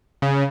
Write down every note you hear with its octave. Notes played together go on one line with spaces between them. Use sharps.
C#3